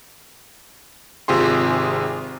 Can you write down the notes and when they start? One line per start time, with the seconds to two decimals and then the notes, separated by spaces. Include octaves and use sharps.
1.28 G#1 C3 F4 G4 G#4 C6